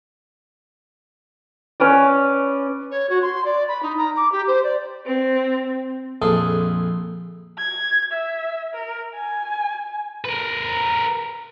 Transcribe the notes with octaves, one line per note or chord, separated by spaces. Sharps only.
C#4 B4 D5
C#5
F#4
C6
D5
B5
D#4
A#5
D6
G4
C5
D5
C4
A#1 F2 G#4 A4 C6
G#6
E5
A#4
G#5
A#4 B4